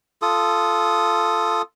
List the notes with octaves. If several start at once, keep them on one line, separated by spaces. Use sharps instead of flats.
F4 A4 D#6